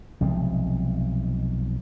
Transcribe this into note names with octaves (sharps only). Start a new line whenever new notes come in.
B1 C3 F3 G#3